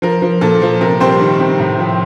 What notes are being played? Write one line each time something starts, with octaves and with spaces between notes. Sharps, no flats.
F3 A#4
F3
A#2 A4
F3
C3 A#4
G3 C4 C5
D#3
C3
A2
F3